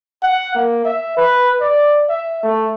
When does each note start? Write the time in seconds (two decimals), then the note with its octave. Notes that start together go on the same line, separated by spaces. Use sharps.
0.23 F#5
0.55 A#3
0.85 E5
1.17 B4
1.61 D5
2.09 E5
2.43 A3